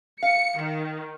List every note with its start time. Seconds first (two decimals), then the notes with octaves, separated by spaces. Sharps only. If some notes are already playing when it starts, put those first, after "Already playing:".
0.23 F5 C#7
0.59 D#3